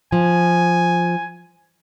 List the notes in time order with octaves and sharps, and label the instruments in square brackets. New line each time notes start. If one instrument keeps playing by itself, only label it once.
[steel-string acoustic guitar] F3 [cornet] G#5